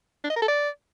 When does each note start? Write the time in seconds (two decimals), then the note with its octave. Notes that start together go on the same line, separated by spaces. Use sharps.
0.24 D4
0.30 D#5
0.36 A#4
0.42 A4
0.48 D5